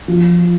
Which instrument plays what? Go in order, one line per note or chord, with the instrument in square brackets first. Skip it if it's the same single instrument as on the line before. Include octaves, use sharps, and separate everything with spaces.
[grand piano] F3